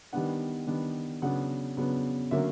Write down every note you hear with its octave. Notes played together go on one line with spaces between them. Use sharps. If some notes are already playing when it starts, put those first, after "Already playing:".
D#3 G3 B3 D4 F#5
D#3 G3 B3 D4
C#3 F#3 B3 D4 F#5
C#3 F#3 B3 D4
D3 F#3 A#3 C#4 E5